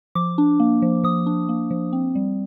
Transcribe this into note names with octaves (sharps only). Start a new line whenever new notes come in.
F3 D6
D4
A#3
F3
F3 D#6
D4
A#3
F3
C4
G3